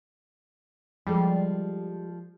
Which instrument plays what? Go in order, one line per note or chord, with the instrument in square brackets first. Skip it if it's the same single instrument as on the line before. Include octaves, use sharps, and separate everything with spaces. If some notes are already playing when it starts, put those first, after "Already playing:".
[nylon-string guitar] F3 G#3 A4 [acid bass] G3